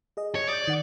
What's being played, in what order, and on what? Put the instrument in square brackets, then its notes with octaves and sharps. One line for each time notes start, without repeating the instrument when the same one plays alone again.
[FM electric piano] G#4 D#5
[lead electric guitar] C#5
[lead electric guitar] D5 [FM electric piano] D#6 G6
[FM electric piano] D#3 F#5